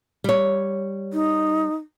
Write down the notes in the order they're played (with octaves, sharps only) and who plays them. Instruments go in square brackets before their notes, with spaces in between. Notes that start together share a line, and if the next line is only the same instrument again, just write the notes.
[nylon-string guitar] G3 C#5
[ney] D#4